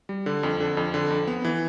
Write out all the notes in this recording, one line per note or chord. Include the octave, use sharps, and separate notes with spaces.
G3
D3
F2
D3
F2
D3
F2
B3
E3